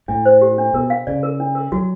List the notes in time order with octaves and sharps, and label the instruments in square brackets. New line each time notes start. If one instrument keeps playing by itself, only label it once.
[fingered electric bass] A2 [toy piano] D4
[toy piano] C5
G4
D4
[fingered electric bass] B2 [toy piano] A#4
[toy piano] F5
[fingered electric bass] C#3 [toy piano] D5
[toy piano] A#4
D4
A#4
[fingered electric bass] F#3 [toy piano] F#4